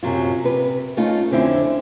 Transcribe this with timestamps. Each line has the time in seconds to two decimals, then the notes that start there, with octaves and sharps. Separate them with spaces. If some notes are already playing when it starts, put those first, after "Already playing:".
0.03 F#2 C3 F#3 F4
0.44 C3 B4
0.97 A3 C#4 D#4 F4
1.31 F2 D3 C4 C#4 E4